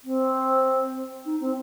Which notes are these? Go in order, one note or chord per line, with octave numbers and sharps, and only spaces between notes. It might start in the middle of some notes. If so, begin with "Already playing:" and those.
C4
D#4
C4